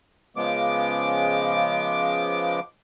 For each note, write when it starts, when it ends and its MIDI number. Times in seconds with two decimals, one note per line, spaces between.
0.36 2.60 49
0.36 2.60 53
0.36 2.60 56
0.36 2.60 59
0.36 2.60 86